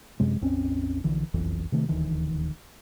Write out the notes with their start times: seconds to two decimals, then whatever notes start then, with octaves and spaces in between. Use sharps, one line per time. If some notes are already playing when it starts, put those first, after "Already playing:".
0.20 F#2 C3 G#3
0.41 A1 E2 C4 C#4
1.04 A#1 D3 E3
1.34 F#1 B1 F2 E3
1.72 C3 D#3 A3
1.88 D#1 D2 D#3 E3